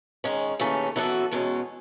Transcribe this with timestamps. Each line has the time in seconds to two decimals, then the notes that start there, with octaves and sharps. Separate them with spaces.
0.24 D#3 G#3 C#4
0.60 D#2 C#3 E3 A3 C#4
0.96 F#2 E3 B3 F#4 A4
1.31 E2 B2 G#3 C#4